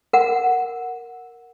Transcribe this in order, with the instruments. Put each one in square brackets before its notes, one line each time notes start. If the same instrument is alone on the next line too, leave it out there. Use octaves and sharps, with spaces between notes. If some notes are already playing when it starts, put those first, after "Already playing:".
[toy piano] A#4 F#5